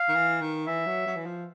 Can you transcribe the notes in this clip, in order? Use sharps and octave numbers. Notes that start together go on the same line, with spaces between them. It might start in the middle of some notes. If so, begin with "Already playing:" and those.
Already playing: F5
D#3
E3
D#3
E3 E5
F#3
F#3
E3
F3